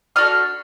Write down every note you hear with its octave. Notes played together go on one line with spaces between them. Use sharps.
D4 F#4 A4 D#6 F6